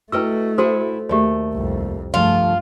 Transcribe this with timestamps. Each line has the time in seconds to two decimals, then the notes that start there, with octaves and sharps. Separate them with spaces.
0.12 A3 E4 F#4 B4 D#5 G5 E6
0.58 E4 F#4 A4 C5 F#5 G#5
1.09 D#2 A3 G4 D5
1.53 C2 F2
2.14 G2 C#3 F3 A3 F4